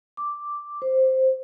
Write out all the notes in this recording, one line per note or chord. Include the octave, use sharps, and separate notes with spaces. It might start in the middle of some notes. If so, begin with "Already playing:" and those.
D6
C5